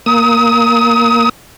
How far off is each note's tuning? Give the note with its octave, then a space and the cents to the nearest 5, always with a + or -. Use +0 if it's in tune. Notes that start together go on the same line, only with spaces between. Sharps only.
A#3 +0 D#6 +30